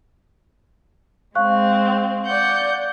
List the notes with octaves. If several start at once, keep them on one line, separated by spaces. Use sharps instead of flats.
G#3 C4 F5 C#6 F#6
D5 F#5 G6